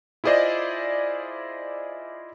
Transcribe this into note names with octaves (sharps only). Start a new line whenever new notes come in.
E4 F4 G#4 C5 D5 D#5